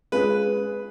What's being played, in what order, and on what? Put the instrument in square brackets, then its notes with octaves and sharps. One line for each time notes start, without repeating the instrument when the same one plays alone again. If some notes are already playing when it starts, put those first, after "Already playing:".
[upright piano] G#3 C#4 F4 G#4 [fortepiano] B4